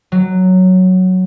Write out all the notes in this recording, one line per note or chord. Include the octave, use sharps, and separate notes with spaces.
F#3